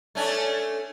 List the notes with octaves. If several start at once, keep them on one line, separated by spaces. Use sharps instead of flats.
A3 C#4 D4